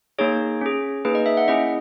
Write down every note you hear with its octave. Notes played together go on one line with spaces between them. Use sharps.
A#3 D#4 G#4 C#5
C#4 G#4
A#3 D#4 G#4 B4
D#5
E5
F#5
A#3 C#4 E4 G#4 D#5